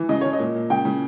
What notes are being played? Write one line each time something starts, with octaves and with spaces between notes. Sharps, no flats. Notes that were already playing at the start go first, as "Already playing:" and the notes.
Already playing: E3
C#3 D#5
C#3 C#5
D#5
A#2
A#2
C#3 G5
C#3